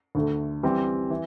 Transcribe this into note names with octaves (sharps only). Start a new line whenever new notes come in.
D2 D3 A3
E3 G3 C4 E4
E3